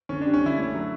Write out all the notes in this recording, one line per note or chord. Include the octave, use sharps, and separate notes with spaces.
D3 C#4
D4
G3
C#4
D3 E4
A3
F#3